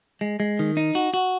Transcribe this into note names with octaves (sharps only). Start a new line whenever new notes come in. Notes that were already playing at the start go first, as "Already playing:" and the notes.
G#3
G#3
D#3
D#4
F#4
F#4